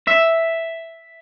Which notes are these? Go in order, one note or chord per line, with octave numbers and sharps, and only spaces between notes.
E5